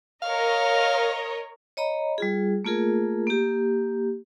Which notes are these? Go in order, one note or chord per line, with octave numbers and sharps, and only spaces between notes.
A#4 C#5 D#5 F5
C#5 D#5 A#5 B5
G3 F4 G#4
A3 A#3 F4 G#4 A#4
A#3 G4